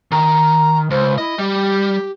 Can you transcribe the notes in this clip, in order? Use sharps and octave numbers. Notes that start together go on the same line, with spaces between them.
D#3 A#5
C#2 C5
E4 D#5
G3 G4